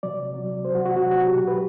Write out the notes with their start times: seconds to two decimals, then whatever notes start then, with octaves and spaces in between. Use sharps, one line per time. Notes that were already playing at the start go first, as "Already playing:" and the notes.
0.03 C3 F#3 D5
0.34 C3 F#3
0.65 F#3 C5
0.69 C3
0.75 F#4
0.85 F#4
0.96 C3 F#3 F#4
1.11 F#4
1.27 B2 F#3 G4
1.37 G4
1.47 B4